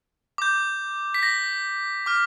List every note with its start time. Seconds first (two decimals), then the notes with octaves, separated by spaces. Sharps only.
0.38 D6 G6
1.14 B6
1.23 A#6
2.06 D6 F6